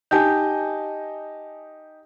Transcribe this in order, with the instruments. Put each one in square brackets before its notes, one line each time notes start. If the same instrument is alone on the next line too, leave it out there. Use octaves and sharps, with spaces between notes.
[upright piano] D#4 G4 D#5 [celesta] G#5 A5 G6